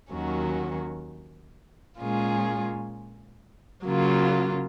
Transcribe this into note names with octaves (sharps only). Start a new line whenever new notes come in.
D#2 D#3 F#3 C#4 F#4
A#2 G#3 C#4 F4 G#4
C#3 F#3 A#3 F4